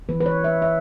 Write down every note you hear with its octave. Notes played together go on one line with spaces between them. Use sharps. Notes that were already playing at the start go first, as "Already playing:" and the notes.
E3 B3 B4
B4
C#5
E5
E5